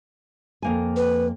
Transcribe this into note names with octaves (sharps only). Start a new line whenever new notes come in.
F2 A#3 G#5
B4